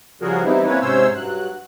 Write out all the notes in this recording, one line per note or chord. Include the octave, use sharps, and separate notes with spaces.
C#3 F3 G3 F#4 G#4 A#4
E3 G3 B3 C4 D#4 E4
A#3 C4 C#4 E4 B4 C#5
G#2 C3 C#4 C5 C#5 E6
G2 F#3 F#6